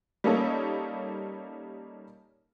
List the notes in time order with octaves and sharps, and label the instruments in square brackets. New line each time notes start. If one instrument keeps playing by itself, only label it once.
[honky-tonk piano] G3 A#3 C#4 D#4 A4 C#5